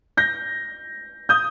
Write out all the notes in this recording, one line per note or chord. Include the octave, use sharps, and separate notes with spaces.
G6 A#6
D#6 G6